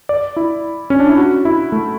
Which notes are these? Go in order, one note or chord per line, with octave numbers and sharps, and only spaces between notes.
D5
E4
C#4
D4
E4
F#4
E4
A3